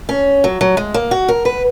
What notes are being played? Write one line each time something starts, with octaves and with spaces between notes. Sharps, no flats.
C#4
F#3
F#3
G#3
A#3
F#4
A#4
B4